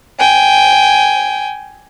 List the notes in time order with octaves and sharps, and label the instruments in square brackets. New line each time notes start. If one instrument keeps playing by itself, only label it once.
[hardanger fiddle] G5 G#5